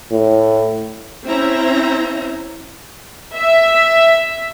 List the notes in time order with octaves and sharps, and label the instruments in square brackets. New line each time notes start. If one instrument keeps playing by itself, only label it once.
[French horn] A2
[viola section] C4 C#4 E4 C5 E5 A#5
[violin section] E5